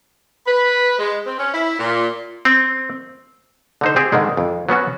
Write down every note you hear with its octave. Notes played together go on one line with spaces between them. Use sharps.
B4
G#3
C4
C#4
E4
A#2
C4
D3 D#4 C5
C4 G4 G#4
G#2 D3 D#3 G#3
F2
F#3 B3 C#4 F#4